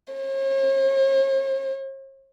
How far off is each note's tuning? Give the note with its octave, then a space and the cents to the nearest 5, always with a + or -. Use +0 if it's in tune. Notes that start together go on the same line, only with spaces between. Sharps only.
C#5 -45